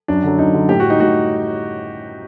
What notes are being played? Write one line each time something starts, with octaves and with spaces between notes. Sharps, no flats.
F#2 D4
D3 F#3
F#2 D#4
D3 F#3
A2 G4
G3 F#4
D#4
A2 F#4